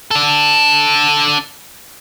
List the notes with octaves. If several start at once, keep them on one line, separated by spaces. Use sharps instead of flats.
D4 A4